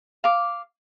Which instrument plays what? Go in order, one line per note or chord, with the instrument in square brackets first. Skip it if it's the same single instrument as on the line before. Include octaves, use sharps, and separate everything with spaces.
[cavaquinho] F5 D6